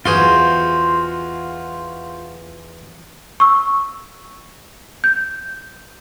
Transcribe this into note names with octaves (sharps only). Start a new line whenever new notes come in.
E2 F4 F#4 G#4 C5 C6
C#6 E6
G6